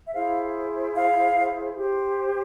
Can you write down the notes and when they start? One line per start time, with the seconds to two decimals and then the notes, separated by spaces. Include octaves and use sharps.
0.06 E5
0.14 E4 G#4 C5 F5
0.95 F5
1.76 G4 C5